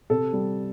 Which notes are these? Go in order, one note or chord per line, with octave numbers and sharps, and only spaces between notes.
C3 A4
G3